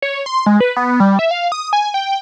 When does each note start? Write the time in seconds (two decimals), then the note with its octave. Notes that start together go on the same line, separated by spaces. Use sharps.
0.02 C#5
0.26 C6
0.46 G#3
0.60 B4
0.76 B3
1.00 G3
1.19 E5
1.31 F5
1.52 D#6
1.73 G#5
1.94 G5